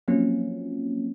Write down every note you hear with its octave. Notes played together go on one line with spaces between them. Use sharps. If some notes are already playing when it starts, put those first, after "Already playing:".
F3 F#3 A#3 C4 C#4 F4